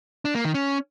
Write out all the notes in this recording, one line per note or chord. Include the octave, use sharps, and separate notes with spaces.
D4
A#3
D#3
C#4